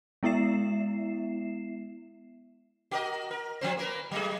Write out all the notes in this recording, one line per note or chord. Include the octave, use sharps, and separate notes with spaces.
G#3 B3 E4 E5 C7 E7
F#4 A#4 D#5
A#4
F3 C4 C5
A#3 A#4 B4
F#3 A3 G#4